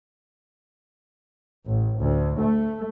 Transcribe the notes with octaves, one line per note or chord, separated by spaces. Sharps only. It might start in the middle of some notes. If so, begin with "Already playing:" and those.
A1
D2
A3